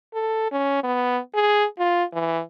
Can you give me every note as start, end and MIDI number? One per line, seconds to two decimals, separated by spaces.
0.14 0.49 69
0.52 0.80 61
0.84 1.19 59
1.34 1.65 68
1.79 2.04 65
2.13 2.41 52